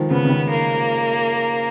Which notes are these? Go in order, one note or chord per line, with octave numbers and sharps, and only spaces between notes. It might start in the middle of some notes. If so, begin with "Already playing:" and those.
Already playing: D#3 F3 G#3
C#3 B3
C#3
D#3
A#3